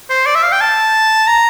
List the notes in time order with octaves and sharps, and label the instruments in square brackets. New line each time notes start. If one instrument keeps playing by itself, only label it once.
[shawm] C5
D5
E5
F5
G5
A5
A#5